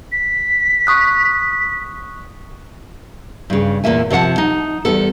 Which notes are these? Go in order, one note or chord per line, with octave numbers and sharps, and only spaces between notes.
B6
C#6 D#6 F#6
G2 C#3
E2 A#2 A#3 E5 G#5
C3 F3 C#5 F#5 A5
D#4
E2 G3 B3 A4